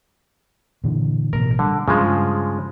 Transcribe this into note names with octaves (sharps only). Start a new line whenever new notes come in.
A#2 D3 E3
A1 B2 A#4
D3 G3
G2 C#3 F3 G#3